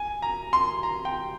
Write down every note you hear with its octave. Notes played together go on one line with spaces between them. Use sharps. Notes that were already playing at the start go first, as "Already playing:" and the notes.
Already playing: G#5
A#5
C6
A#5
G5